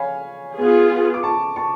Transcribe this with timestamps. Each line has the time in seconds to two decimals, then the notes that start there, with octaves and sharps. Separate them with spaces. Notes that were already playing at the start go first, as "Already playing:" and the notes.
Already playing: C#5 F5 G#5 B5
0.57 B3 F4 G#4
1.14 D6
1.23 A5 C#6
1.56 A5 C#6